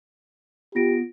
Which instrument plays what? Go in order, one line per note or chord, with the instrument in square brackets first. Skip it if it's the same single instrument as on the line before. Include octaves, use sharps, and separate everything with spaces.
[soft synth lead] B3 [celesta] F4 A#6 D7 [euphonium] G4